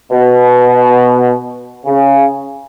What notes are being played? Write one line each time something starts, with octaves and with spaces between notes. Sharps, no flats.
B2
C#3